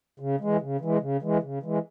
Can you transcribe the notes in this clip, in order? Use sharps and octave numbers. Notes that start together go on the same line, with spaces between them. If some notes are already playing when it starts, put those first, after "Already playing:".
C#3
E3 G#3
C#3
E3 G#3
C#3
E3 G#3
C#3
E3 G#3